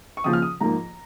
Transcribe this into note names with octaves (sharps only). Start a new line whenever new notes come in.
C#6
D#2 C#3 F3 D#6
F6
D#6
G#2 F3 A#3 A#5